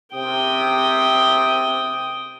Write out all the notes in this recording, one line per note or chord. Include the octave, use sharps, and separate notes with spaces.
C3 G5 D#6